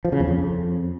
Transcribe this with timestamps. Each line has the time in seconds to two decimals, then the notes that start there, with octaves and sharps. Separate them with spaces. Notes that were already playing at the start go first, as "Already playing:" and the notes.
0.05 F3
0.12 C#3
0.20 E2
0.28 F2